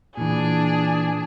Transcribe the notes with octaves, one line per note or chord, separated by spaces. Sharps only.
A#2 D#3 E3 D4 G#4